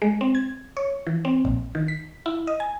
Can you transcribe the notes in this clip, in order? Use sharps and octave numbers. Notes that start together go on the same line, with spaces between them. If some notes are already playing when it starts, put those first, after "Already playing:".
G#3
C4
G#6
C#5
E3
C4
A#1
D#3
B6
E4
D#5
G#5